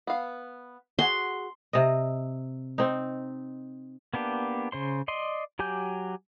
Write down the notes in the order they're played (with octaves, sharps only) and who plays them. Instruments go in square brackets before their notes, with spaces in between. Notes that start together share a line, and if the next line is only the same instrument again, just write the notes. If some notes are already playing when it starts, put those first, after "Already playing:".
[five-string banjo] B3 F5
[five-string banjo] F#4 G#4 F#5 [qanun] C6
[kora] C3 D#5
C4 D#4
[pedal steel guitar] A#3 B3 D4 G4
C#3 C5 C6
D5 D#5 C6
F#3 G4 G#5 D6 G6